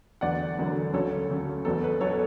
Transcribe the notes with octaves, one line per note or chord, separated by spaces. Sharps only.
E1 E2 D3 F#3 D5 F#5
E1 E2 D3 F#3
D2 C#3 F#3 A4 C#5
D2 C#3 F#3
E1 E2 B2 F#3 A4
B4
B2 F#3 A4 C#5